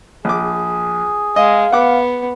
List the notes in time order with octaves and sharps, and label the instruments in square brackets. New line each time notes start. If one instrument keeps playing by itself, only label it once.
[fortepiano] A#1 D6 [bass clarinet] G#4
[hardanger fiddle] G#3 [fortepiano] D#5 [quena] F5
[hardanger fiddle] B3 [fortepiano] F#5 D6